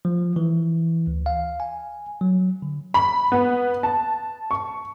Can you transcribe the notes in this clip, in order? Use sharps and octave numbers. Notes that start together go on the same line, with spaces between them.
F3
E3
D2
F5
G#5
F#3
D3
B5
B3
A5
C#6